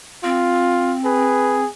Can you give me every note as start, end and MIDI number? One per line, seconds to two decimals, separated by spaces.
0.24 1.64 60
0.24 0.96 65
1.05 1.70 68
1.05 1.63 71